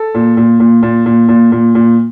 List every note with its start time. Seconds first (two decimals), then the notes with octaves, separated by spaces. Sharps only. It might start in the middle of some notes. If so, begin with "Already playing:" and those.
Already playing: A4
0.15 A#2
0.37 A#2
0.60 A#2
0.83 A#2
1.06 A#2
1.28 A#2
1.52 A#2
1.75 A#2